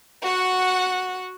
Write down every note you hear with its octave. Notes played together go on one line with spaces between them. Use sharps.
F#4 F#5